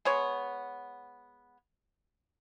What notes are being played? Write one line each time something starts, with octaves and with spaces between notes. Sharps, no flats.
G#3 B3 C#5